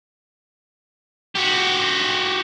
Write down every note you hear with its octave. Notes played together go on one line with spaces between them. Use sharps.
F#4 G4